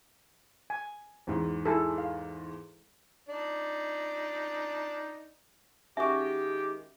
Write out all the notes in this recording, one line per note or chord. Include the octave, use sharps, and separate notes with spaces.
G#5
E2 G#2
E4 G#4 A4
F5
D4 D#4 D5
D#3 G#3 C#4 F#4 G4 E5